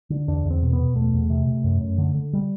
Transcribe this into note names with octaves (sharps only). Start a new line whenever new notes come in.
D3
E2 D4
E2
C4
B2
B3
B2
E2 A3
E2
C3
C3
F#2
F#2
D3
D3
G3